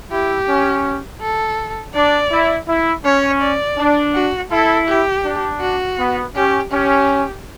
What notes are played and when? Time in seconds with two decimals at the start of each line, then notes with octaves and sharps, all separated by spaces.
0.11 E4 G4
0.48 C#4
1.21 A4
1.95 D4 D5
2.32 E4
2.68 E4
3.04 C#4 C#5
3.41 D5
3.78 D4
4.15 F#4
4.51 E4 A4
4.88 G4
5.25 D4
5.61 F#4
5.99 B3
6.35 C#4 G4
6.72 C#4 G4